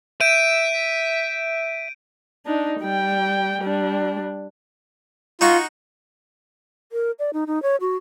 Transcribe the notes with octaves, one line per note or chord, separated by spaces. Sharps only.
E5 G6 D7 D#7
D4 D#4
G3 G5
G3 D4
D#4 F4 F#4 C#6
A#4
D5
D#4
D#4
C#5
F#4